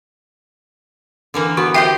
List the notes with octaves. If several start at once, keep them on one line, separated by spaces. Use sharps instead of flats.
D3 E3 A#3
B3 F#4
G4 C5 D#5 E5 G5